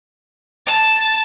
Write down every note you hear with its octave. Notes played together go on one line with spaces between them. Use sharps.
A5 A6